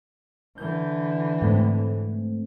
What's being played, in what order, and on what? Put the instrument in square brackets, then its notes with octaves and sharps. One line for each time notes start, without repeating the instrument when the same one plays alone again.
[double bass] D3 E3 [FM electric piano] G6
[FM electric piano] G#2 A3 C4